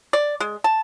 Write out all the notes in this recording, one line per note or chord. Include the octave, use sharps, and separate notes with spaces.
D5
G#3
A5